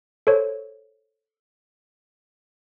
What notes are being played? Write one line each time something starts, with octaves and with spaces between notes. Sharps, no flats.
A4 C5 C#5